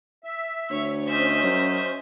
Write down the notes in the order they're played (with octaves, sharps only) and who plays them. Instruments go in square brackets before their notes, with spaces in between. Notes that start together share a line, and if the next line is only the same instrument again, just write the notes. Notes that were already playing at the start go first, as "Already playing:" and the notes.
[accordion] E5
[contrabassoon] D2 [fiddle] C#5
[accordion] C#4 C5 [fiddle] D#5 E5
[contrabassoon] F#2